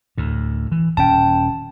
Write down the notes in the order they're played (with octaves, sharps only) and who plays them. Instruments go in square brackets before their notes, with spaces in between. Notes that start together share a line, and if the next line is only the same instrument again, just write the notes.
[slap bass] D2 A2
E3
[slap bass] D#1 C#4 [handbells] G5 A5